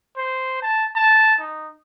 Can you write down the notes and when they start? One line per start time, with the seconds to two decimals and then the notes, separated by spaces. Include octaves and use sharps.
0.17 C5
0.63 A5
0.96 A5
1.40 D#4